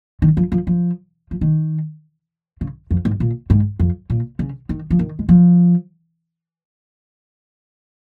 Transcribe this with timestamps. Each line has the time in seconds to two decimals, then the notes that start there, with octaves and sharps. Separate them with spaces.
0.22 D#3
0.37 F3
0.52 F3
0.67 F3
1.31 F3
1.41 D#3
2.61 C#3
2.91 F2
3.05 G#2
3.20 A#2
3.50 G#2
3.79 F2
4.10 A#2
4.39 C#3
4.69 D#3
4.90 F3
4.99 D#3
5.19 G#3
5.29 F3